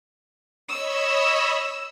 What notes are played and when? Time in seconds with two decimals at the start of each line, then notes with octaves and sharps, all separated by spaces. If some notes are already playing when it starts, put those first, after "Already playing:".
0.68 C#5 D#5 B5 E6